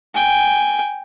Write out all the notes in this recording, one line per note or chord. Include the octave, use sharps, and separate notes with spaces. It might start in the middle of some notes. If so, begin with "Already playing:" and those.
G5 G#5